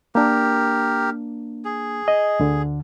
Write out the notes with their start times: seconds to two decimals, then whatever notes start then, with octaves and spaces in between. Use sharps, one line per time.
0.15 A#3 D4 G4 A#4
1.65 G#4
2.08 D#5
2.39 D2 D3